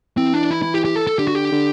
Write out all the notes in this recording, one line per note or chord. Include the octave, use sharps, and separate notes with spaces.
E3 C4
D4
E4
E4
G4
G4
A4
A4
D3 G4
F#4
G4
D3